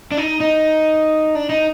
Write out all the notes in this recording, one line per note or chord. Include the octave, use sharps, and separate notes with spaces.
D4
D#4
D#4
D4
D#4